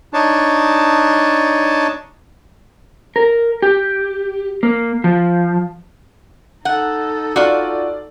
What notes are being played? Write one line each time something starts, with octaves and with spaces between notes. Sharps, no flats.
D4 D#4 C#5 A5
A#4
G4
A#3
F3
D#4 A4 F#5
F4 F#4 D5